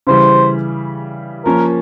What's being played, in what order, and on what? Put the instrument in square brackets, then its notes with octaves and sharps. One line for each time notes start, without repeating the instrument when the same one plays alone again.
[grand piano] C#3 E3 G3 [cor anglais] C5
[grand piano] F3 A#3 C#4 [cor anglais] A#4